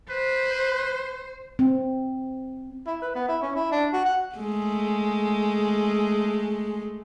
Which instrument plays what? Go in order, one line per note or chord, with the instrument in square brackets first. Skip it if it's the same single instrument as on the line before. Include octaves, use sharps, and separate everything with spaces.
[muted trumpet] B4 [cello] C5
[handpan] C4
[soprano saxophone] E4
B4
B3
E4
C#4
E4
D4
F#4
F#5
[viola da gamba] G#3 A3